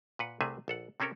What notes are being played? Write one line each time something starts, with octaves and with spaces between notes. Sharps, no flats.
A#2 B4 F#5
C2 C3 A3 G#4 B4 E5
A#1 A4 F#5
C3 C4 C#4 A4 A#4